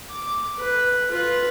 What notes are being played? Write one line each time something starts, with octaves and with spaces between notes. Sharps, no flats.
D6
B4
F4 B4